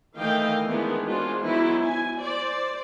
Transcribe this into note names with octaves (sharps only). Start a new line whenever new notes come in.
D#3 E3 A3 D#5 F5 G5
D#3 E3 G#3 B3 D4
G#3 C4 D4 F4 F#4
E3 F#3 B3 D#4 E4
G#5
C5 D5